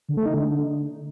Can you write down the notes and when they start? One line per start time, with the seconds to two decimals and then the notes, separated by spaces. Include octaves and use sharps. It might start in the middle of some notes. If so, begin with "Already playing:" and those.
0.09 D3
0.17 A3
0.26 D#4
0.34 D3